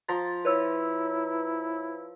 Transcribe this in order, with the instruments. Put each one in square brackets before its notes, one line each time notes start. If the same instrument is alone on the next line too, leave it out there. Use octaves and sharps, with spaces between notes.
[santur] F3 A#5 C6 [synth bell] A6
[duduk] E4 [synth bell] B4 C#5 E6